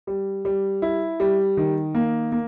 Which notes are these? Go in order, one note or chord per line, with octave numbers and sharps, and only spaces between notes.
G3
G3
E4
G3
D#3
A#3
A#3